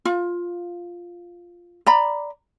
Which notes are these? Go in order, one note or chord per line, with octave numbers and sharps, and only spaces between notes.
F4
D5 A#5 B5